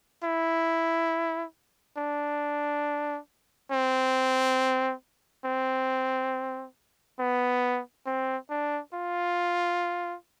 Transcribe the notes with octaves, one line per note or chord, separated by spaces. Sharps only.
E4
D4
C4
C4
B3
C4
D4
F4